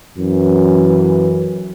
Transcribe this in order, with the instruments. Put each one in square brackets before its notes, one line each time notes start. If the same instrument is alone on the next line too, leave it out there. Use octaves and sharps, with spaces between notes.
[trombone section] F#2 E3